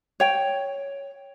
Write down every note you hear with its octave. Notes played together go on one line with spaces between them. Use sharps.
C#5 G5